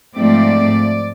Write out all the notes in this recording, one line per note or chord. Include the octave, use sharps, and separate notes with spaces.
G#2 F3 A3 C4 D5